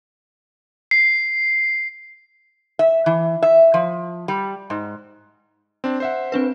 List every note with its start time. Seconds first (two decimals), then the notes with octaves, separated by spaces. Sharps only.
0.91 C7
2.79 E5
3.06 E3
3.42 E5
3.74 F3
4.28 G3
4.70 G#2
5.84 C4 D4
6.00 C5 E5 F#5
6.32 C4 D4 B4